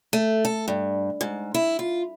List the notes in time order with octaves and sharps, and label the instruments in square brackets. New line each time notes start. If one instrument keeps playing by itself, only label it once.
[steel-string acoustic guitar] A3
A4
G2
G#2
E4
F4